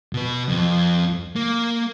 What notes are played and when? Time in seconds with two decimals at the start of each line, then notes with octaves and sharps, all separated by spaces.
0.13 B2 B4
0.49 F2
1.36 A#3